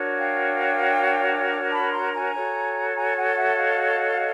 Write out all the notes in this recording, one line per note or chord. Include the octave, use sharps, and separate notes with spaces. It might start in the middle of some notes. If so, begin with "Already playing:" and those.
Already playing: D4 F#4 A#4 C#5
F5 G5
A5 B5
A#5 C6
G#5 A#5
F#4 A4 C#5
G#5 A#5
F#5 G#5
E5 F#5
D#5 F5